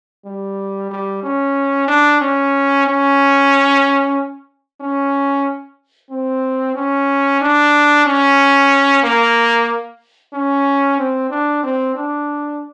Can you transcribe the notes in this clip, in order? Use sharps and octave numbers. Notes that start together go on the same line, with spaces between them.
G3
G3
C#4
D4
C#4
C#4
C#4
C4
C#4
D4
C#4
A#3
C#4
C4
D4
C4
D4